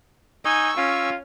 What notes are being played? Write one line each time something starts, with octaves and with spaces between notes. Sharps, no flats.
D#4 G#5 C#6 E6
C#4 F4